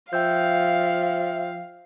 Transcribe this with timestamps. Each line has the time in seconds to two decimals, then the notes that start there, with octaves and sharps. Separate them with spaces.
0.13 F3 E5 F5 G5 E6 G6